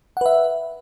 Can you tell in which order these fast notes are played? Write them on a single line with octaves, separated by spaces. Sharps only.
F#5 B4 E5